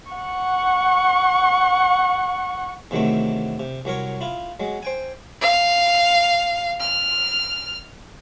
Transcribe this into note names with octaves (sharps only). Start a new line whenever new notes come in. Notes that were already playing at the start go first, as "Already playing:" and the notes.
F#5 C#6
E2 C3 D#3 F#3 A3 C4
C3
C2 F#3 A#4 C#5
E4 F4
F#3 G#3
C5 G5 G#5
F5
F6